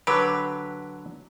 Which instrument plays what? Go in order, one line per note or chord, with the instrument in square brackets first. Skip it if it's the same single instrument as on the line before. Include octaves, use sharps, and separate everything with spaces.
[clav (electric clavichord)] D3 F#3 G4 [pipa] B4